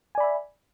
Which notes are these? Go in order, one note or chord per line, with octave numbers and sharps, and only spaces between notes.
D5 E5 G#5 B5